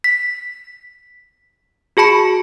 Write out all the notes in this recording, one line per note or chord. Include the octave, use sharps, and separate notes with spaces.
B6
F#4 G#4 A5 B5 C#7